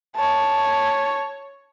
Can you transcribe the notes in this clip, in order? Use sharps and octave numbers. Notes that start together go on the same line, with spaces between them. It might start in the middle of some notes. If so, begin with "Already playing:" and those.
C#5 A5